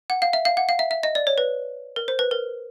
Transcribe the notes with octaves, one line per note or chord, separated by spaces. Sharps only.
F#5
F5
E5
F5
F#5
F5
E5
E5
D#5
D5
C#5
B4
A#4
C5
B4
A#4